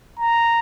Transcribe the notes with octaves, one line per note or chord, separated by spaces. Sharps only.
A#5